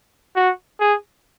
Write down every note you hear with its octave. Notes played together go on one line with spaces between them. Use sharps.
F#4
G#4